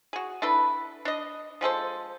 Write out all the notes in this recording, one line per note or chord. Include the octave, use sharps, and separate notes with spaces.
F#4 G#4
D4 E4 A4 B4
D4 D#5
F3 G#3 A4 C5